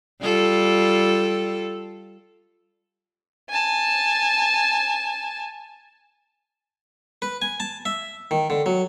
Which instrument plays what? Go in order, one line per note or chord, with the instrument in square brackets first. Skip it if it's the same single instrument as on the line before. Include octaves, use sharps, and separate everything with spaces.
[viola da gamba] G3 F4 A4
[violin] G#5 A5
[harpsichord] B4
G#5
A5
E5
D#3
D3
F#3